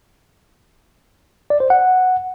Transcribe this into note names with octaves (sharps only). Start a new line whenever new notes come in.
D5
C5
F#5